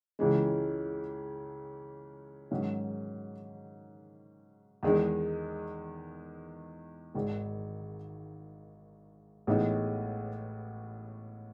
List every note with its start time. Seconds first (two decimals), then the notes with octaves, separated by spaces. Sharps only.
0.19 C#2 C#3 E3 G#3
2.51 G#2 D#3 F#3 C#4
4.83 E2 D#3 G#3 D#4
7.14 G#1 G#2 D#3 G#3
9.47 A1 A2 G#3 B3 D#4